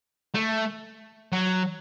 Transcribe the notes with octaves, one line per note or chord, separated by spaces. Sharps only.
A3
F#3